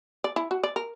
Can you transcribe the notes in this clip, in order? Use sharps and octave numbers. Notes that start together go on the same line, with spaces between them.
D5
E4
F#4
D5
A#4